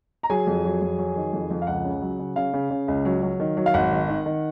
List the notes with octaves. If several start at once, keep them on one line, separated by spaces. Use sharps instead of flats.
A#5
F#3 G#4 G#5
F2
F#3
F2
F#3
D#3
F2
F2
F5
C#2 F#5
C#3
F#3
C#3
C#3 F5
C#3
C#3
C#2
F#3
F#3
D#3
F#3
F5
G#1 F#5
D#3
D#3
D#3